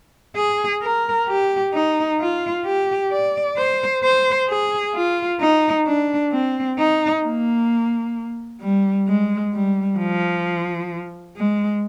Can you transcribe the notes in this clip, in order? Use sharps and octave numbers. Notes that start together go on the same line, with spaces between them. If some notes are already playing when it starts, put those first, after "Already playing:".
G#4
A#4
G4
D#4
F4
G4
D5
C5
C5
G#4
F4
D#4
D4
C4
D#4
A#3
G3
G#3
G3
F3
G#3